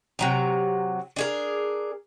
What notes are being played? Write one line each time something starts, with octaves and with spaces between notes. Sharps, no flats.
C3 F#3 A#5
D4 G#4 A#4